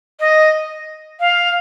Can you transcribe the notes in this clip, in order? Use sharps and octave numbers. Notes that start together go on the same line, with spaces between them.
D#5
F5